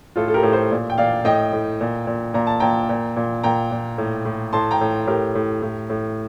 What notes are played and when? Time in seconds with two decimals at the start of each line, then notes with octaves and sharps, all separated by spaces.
0.16 A2 F4 A4
0.28 A4
0.34 G4 A#4
0.43 A2
0.52 A4 C5
0.71 A#2
0.90 G5
0.98 A#2 D5 F5
1.25 A2 D#5 G5
1.53 A2
1.81 A#2
2.07 A#2
2.34 A#2 A#5
2.47 A5
2.60 A#2 G5 A#5
2.89 A#2
3.17 A#2
3.43 A#2 G5 A#5
3.71 A#2
3.98 A2
4.25 A2
4.53 A2 A5 C6
4.71 G5 A#5
4.81 A2
5.07 A2 G4 A#4
5.35 A2
5.62 A2
5.90 A2